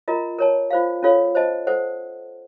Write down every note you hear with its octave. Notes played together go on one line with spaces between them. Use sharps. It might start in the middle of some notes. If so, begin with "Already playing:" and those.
F4 A#4 D#5 A#5
A#4 C#5 A5
F4 C5 F5
C#4 F4 A4 C#5 F5
C5 D#5 A5
A4 C5 F#5